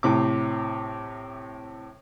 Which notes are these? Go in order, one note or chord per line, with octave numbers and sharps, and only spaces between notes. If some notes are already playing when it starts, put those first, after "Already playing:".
A2 C3 D6